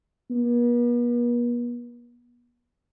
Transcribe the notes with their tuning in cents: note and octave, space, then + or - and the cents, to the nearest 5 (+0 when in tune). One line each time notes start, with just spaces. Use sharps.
B3 -45